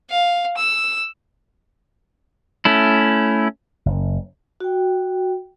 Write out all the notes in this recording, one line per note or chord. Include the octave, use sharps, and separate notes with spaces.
F5
E6
A3 C#4 E4
F#1
F#4 G5